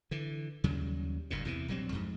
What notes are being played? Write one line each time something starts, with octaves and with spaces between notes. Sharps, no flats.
D3 E3
D#2 C#3 F#3 G3
F#1 G2 A#2
E2 C3 E3
A#1 F#3 G3 C4
F2 G#2